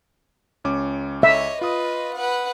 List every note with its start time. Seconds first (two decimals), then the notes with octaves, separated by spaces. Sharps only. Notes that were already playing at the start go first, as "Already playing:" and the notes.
0.64 C#2 C#4 D6
1.23 C#5 D#5 E5
1.61 F4 B4 D#5 D#6
2.14 B4 F#5